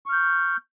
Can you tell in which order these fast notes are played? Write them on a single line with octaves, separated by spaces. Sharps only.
C#6 F6 G6